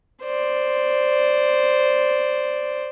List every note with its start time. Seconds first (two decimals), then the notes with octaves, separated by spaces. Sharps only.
0.23 C5 D5